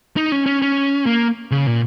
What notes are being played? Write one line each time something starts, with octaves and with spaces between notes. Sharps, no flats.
D#4
C#4
C#4
C#4
A#3
C#3
A#2